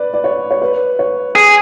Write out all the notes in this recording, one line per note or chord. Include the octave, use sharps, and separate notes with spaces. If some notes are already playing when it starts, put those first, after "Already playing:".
Already playing: B4 D5
D5
C#5
C#5
B4
C#5
G#4